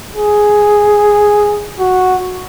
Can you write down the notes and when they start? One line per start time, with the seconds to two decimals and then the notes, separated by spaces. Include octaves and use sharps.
0.16 G#4
1.79 F#4